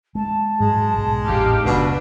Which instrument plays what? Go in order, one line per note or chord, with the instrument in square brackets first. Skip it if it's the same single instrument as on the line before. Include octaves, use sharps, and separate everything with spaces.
[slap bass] G#3 [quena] A5
[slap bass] G#2 F#3 [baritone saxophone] G#3
[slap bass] B1
[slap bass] A1 F2 A2 [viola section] D#4 G4 F5
[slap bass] F#1 C#2 [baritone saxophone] B2 [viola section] D4 B4